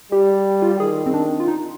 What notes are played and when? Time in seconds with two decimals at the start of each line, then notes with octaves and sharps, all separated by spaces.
0.12 G3 G4
0.62 F4
0.71 G4
0.80 D#3 G#4
1.06 C4
1.14 D4
1.40 F4
1.48 D#4